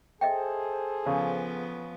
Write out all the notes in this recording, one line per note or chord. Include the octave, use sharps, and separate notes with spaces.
G#4 A4 C5 D#5 E5 G5
C#3 F3 B3